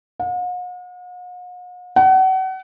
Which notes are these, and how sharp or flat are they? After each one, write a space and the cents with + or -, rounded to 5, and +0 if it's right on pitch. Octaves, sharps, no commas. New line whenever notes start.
F#5 -45
F#5 +35